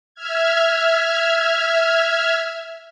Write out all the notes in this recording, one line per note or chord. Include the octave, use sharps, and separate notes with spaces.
E5 F6 G#6